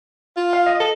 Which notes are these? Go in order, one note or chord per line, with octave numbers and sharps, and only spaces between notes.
F4
F5
D#5
A4